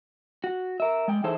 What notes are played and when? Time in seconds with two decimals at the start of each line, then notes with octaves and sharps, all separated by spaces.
0.44 F#4
0.80 A#4 E5
1.08 G#3 G5
1.24 E3 D#4 G#4 A4 C5 E5